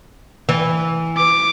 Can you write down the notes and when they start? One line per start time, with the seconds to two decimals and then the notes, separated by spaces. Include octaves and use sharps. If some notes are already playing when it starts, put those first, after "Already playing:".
0.49 E3
1.17 D6